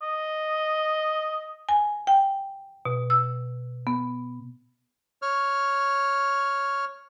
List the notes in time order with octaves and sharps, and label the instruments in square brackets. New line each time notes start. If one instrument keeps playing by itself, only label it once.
[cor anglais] D#5
[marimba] G#5
G5
B2
E6
B3
[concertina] C#5 F6